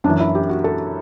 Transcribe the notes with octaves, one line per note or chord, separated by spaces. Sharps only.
F#2 D4
E3
E4
G4
F#4
A4